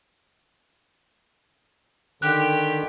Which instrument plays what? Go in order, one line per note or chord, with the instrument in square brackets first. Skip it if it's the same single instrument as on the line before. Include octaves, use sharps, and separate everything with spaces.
[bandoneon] D3 [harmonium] D#3 [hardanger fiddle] G4 [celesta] F#6